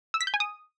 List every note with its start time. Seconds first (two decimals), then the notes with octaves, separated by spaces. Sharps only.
0.14 E6
0.21 B6
0.27 G6
0.34 G#5
0.40 D#6